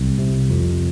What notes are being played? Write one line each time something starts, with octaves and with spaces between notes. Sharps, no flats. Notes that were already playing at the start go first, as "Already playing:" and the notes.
Already playing: C2
C3
F2